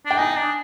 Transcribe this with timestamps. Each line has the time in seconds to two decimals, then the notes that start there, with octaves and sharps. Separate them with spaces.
0.05 D4
0.11 G5
0.17 D#4 G#5
0.36 D4